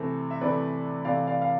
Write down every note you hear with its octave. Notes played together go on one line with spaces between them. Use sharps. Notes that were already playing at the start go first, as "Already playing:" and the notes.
Already playing: C3 E3 A3 A4 C5
E5
C3 E3 A3 B4 D5
C3 E3 A3 D5 F5
D5 F5
F5